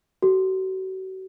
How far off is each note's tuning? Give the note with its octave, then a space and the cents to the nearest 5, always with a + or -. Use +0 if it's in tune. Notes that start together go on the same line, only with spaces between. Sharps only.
F#4 +35 A4 +0